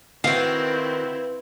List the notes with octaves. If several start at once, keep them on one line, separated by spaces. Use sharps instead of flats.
D#3 C4 E4 F#4 B4 F5